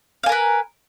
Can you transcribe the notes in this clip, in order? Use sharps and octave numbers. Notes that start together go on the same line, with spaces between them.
A#4 B4 F5 G#5